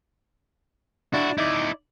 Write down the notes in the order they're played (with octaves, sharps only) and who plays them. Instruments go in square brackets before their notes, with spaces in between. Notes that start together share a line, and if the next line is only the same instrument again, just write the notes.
[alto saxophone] D4 [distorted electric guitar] E4 F#4
[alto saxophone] D#4 [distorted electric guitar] E4 D5